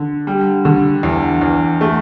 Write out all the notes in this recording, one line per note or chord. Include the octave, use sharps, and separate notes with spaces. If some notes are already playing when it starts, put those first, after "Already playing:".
Already playing: D3
G3
D3
E2
E2
A3